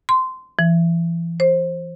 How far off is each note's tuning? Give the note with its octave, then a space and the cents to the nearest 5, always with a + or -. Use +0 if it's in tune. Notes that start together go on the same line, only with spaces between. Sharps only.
C6 -15
E3 +35
C5 +20